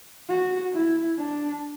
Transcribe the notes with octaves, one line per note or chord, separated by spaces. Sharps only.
F#4
E4
D4